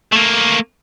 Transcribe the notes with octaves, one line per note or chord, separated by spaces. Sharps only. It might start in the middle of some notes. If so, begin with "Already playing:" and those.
A3 A#3